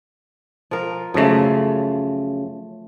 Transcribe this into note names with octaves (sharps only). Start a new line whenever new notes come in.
F3 A#4
F#2 C#3 F3 A3